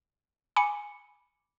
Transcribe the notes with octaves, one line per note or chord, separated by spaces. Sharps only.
G#5 B5 D6 C#7